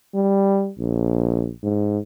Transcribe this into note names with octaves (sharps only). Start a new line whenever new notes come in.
G3
A#1
G#2